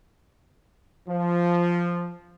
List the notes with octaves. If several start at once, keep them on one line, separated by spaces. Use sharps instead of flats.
F3